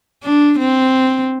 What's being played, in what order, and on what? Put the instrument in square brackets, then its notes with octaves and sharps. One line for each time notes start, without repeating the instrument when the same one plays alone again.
[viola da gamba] D4
C4